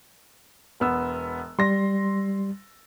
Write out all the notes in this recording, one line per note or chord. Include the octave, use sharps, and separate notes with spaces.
E1 B3 E6
G3 C6 A#6